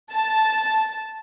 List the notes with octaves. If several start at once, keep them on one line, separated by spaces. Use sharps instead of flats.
A5